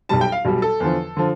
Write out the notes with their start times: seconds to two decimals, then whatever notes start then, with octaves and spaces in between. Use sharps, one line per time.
0.09 B1 B2 G3 A5
0.21 G5
0.32 F5
0.45 B1 B2 G3
0.62 A4
0.80 E2 D3 F3
1.17 D3 F3